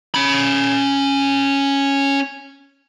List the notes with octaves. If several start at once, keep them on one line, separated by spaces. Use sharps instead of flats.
C#4 B5